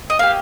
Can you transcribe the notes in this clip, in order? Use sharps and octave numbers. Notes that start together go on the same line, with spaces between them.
D#5
A#3 G4 F5